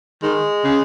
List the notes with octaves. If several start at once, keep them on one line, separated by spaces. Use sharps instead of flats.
D#3 G#3
C#3